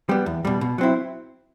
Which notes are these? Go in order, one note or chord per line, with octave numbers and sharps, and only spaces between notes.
G3 B3
E2
B2 G3
B2
F#3 C4 E4